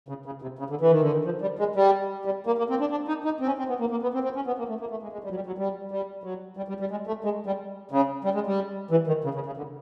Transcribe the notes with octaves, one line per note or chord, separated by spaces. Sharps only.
C#3
C#3
C3
C#3
D3
E3
D#3
D3
D#3
F3
G3
G#3
G3
G3
A#3
A#3
C4
D4
D4
D#4
D#4
C4
C#4
C4
B3
A#3
A#3
B3
C4
C4
C#4
B3
A#3
A3
A#3
A3
G#3
G#3
G3
F#3
G3
F#3
G3
G3
F#3
G3
G3
G3
G#3
A3
G#3
G3
C#3
G3
G#3
G3
E3
D#3
C#3
C#3
C#3
D3